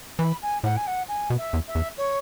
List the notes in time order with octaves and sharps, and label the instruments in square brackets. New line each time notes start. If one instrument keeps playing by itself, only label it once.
[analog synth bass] E3 [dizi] B5
[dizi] G#5
[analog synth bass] A2 [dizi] F#5
[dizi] G#5
F#5
G#5
[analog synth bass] B2
[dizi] E5
[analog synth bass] E2
[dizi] E5
[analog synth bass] E2
[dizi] C#5